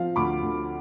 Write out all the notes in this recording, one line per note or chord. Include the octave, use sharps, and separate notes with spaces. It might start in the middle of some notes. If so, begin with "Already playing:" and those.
Already playing: F3 C4 F5
D2 B5 D6
D2